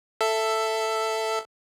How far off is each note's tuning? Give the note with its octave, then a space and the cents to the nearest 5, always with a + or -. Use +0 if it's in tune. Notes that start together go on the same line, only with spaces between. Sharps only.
A4 +5 E5 +10